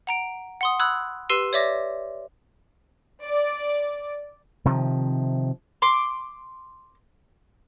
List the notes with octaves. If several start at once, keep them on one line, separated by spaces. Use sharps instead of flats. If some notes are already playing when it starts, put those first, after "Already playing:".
F#5 A#5 D7
F#5 C6 D#6
B5 D#6 E6 F#6 G#6
G4 B4 C6 E6 C7 D#7
C#5 D5 E5 D6 A#6
D5
C3 D#3 F3
C6 D6